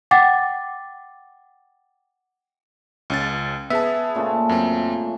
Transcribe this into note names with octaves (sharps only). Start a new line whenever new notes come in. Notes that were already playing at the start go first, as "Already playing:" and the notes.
F#5 G5 D6 A6
C#2 C#4 A6
B3 G#4 E5 A5
A#2 C#3 A3
F#2 C4